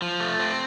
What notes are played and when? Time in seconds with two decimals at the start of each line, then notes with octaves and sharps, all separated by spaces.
0.02 F3
0.20 A3
0.39 C4